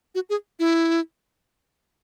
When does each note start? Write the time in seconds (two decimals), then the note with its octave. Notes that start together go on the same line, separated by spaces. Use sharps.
0.15 F#4
0.29 G#4
0.59 E4